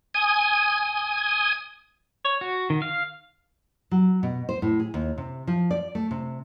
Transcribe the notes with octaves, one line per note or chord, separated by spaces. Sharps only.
G#5 D#6
C#5
F#4
D#3
F5
F#3
B2
C5
A2
G#4
D#2
C3
F3
D5
A3
C3